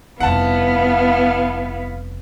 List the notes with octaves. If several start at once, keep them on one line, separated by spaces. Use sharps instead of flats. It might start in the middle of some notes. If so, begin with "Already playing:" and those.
F1 G2 B3 E4 F5 F#5 A5